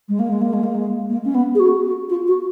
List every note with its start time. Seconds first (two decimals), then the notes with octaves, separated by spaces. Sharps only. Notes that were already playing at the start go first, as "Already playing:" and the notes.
0.08 G#3
0.19 A#3
0.30 G#3
0.41 A#3
0.53 G#3
0.63 A#3
0.74 G#3
1.09 A#3
1.25 C#4
1.34 B3
1.55 G#4
1.60 F#4
1.84 F#4
2.09 F4
2.27 F#4